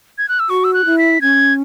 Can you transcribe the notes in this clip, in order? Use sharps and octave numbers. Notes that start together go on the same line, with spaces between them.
G#6
F#6
E6
F#4 C#6
E6
F#6
E4
B6
C#4 G#6